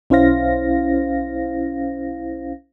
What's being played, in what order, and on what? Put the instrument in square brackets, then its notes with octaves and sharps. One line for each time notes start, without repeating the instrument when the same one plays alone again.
[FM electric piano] B1 C#4 E4 C5 F5 A#6